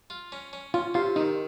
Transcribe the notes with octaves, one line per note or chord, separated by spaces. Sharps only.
F4
C#4
C#4
C#4 F4
C3 F4
D#3 D#4